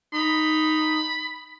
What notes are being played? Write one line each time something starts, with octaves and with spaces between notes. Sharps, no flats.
D#4 B5